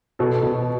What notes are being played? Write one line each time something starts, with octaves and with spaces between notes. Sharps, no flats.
B2 A4
B2